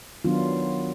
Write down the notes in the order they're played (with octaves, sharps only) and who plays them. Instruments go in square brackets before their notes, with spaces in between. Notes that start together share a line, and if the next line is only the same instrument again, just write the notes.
[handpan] D#3 F#3 B3 D4 F4